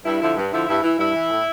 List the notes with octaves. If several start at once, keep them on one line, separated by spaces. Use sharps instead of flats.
G2 E4
D3 F3 E4
G2
D3 F3 E4
G2 E4
E3 E4
G2 E4
E3
A2